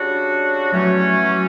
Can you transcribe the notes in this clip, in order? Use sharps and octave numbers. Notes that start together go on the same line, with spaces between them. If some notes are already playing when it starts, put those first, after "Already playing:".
Already playing: C#3 G3 D4 F#4
E3 F#3 A3 C#4
F#3